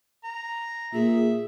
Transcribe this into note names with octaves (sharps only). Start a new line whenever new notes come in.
A#5
A#2 G#4 E5